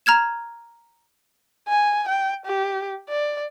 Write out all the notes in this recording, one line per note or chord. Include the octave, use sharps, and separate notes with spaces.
A#5 F6 G#6 E7
G#5
G5
G4
D5